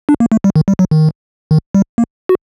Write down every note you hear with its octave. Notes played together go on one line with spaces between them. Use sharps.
D4
A#3
A3
G3
D#3
G3
F#3
D#3
D#3
G3
A#3
F#4